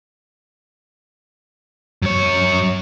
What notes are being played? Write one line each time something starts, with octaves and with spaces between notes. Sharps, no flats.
F#2 C#5